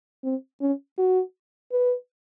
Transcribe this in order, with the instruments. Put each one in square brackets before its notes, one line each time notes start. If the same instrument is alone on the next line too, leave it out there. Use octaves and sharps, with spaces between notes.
[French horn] C4
C#4
F#4
B4